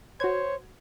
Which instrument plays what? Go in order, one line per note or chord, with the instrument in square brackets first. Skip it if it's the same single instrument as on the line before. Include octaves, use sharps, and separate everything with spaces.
[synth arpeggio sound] F#4 G#6 [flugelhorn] C5 [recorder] C#5